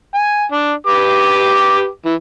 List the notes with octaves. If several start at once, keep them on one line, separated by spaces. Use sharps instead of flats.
G#5
D4
G4 B4 D6
E3